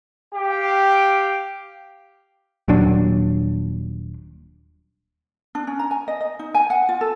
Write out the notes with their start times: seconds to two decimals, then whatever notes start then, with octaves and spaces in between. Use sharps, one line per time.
0.33 G4 F5 G5
2.68 D#1 A#2 F#3 D4
5.55 D4
5.67 C#4
5.79 A#5
5.91 G#5
6.08 D#5
6.21 D#5
6.39 D#4
6.54 G#5
6.70 F#5
6.89 F4
7.01 A4